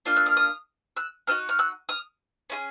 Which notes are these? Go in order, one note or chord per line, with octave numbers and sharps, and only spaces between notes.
A#3 D4 F4 F6 G6
E6 F#6
D#6 F6
D#6 F6
E6 F#6
C4 D#4 F#4 F6 G6
F6
E6 F#6
D#6 F6
C#4 F4 G#4